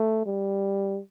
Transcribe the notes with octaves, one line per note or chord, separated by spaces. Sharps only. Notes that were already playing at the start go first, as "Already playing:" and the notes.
Already playing: A3
G3